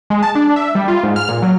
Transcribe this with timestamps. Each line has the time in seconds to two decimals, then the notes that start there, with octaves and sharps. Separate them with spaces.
0.10 G#3
0.23 A5
0.35 D4
0.56 E5
0.75 G3
0.88 F4
1.04 G#2
1.16 F6
1.29 A#2
1.42 F#3